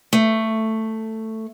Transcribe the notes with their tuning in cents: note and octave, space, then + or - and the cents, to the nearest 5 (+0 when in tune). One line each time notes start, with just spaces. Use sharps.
A3 +10